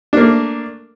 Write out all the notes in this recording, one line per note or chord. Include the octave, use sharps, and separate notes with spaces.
A3 A#3 D4